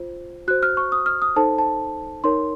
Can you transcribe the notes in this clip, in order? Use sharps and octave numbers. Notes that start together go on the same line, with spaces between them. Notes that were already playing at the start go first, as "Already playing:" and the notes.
Already playing: F4 C5
F#4 C5 F#6
F6
C#6
D#6
F6
D#6
D#4 A4 C5 A5
A5
D#4 A#4 C#5 C6